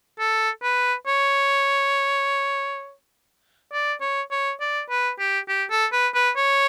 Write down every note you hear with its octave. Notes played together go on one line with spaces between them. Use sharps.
A4
B4
C#5
D5
C#5
C#5
D5
B4
G4
G4
A4
B4
B4
C#5